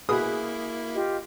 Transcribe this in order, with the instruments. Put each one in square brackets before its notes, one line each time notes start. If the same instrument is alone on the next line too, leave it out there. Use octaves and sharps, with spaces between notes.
[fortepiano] B2 D#6 [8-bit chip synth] A#3 E4 [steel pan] G#4 B4
[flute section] F4 G4 D#5